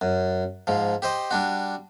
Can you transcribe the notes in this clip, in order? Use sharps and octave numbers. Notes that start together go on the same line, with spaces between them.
F#2
G#2 F3
G4 C5 D#5
G3 D4 F#4